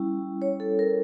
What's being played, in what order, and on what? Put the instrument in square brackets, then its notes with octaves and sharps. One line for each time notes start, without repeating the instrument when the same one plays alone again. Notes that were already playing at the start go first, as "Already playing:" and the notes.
Already playing: [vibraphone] G3 C#4 E4
C#5
A4
A#4